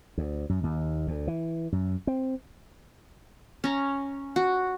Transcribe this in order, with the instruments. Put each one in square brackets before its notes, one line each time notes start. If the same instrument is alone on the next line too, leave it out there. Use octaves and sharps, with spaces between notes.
[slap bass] D2
F#2
D#2
D2
E3
F#2
C4
[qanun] C#4 A#5
F#4